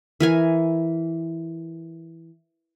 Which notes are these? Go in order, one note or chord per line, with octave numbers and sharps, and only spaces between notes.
E3 A#4 G#5